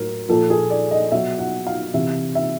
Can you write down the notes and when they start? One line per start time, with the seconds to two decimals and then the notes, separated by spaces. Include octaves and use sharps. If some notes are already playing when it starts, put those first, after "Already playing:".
Already playing: A2 F#3 A#4
0.28 A#2 F3 A4
0.50 G#4
0.70 D5
0.91 D#5
1.11 B2 F#3 E5
1.39 F#5
1.67 F5
1.94 C3 E3 E5
2.35 E5